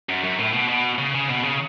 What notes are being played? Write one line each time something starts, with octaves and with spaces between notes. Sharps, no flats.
F#2
F#2
A2
B2
B2
C#3
C#3
B2
C#3